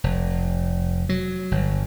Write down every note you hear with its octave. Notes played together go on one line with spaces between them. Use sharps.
F1
F#3
G1